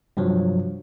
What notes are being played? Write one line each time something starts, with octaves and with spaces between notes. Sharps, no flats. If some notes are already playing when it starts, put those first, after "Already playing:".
G2 C3 F3 F#3